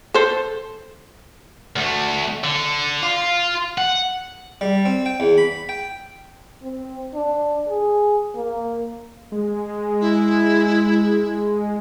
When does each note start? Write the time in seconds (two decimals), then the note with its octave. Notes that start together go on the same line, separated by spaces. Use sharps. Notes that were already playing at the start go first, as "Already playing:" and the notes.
0.14 A4 C5
1.76 D2 A3
2.44 D3
3.02 F4
3.78 F#5
4.61 G3
4.85 C4
5.06 G5
5.20 E2
5.38 B5
5.69 G5
6.63 C4
7.14 D4
7.68 G#4
8.35 A#3
9.32 G#3
10.01 E4